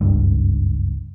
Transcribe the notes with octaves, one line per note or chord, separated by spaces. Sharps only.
F#1 C#2 G2